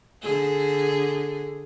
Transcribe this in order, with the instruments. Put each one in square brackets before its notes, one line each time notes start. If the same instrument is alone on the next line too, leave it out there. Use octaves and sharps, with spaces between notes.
[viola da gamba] D3 G#4